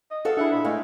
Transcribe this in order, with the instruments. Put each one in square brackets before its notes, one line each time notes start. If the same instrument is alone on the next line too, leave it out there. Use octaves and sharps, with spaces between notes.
[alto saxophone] D#5
[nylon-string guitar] F#4 A4 F5
[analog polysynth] D4 E4 [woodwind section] G#4 F#5 [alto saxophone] E5
[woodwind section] A#2 B5
[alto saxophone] G#3 [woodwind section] A3 [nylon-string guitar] F5